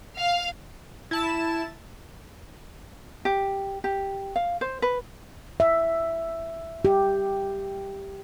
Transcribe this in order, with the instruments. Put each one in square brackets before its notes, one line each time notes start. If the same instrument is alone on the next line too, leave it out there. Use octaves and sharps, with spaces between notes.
[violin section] F5
[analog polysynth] E4 A5 E7
[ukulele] G4
G4
F5
C5
B4
[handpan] E5
G4